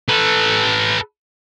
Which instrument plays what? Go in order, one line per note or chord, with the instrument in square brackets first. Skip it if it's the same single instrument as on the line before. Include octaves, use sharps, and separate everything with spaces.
[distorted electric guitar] A4 B4